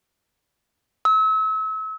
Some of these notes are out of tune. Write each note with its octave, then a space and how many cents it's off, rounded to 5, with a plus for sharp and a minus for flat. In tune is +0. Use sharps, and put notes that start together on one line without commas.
E6 -35